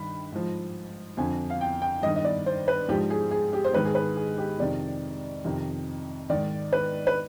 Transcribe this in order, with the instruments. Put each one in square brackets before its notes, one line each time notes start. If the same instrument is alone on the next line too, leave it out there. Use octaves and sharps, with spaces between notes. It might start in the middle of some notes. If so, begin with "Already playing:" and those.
Already playing: [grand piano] G2 D#3 B5
G#2 F3
F2 D3 F3 G#5
F5
G5
G5
G2 D#5
D#3
D#5
D5
C5
B4
G#2 F3 G4
G#4
G#4
G4
C5
G#2 D#3 B4
G#4
B4
G#4
G4
F2 C3 D#3 D5
F2 C3 D#3
G#2 D#3 D5
B4
B4